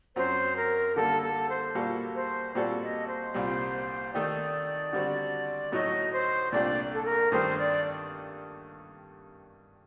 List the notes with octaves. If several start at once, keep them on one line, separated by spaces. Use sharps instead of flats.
F#2 F#3 C4 C5
A#4
D3 G3 A#3 A4
A4
C5
A#2 G3 A#3 F#4 A4
C5
A#2 G3 C4 F#4 A4 D5
D#5
C5
C2 A#2 G3
D#3 A3 D#4 G4 D5
D3 G3 C4 F#4
A2 F#3 A3 D#4 F#4 D#5
C5
C2 A#2 A3 D4 G4 D5
A4
A#4
G2 D#3 A3 D4 G4 C5
D5